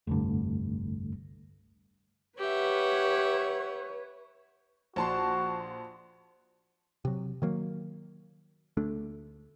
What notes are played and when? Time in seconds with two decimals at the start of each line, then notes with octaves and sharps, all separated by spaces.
0.07 F1 C2 G2 D3 A3
2.39 G4 B4 C#5 E5 F#5
4.96 A#1 F#4 A5 C6
7.05 C3 F#3
7.42 D#3 F#3 A#3
8.77 D2 A3 D4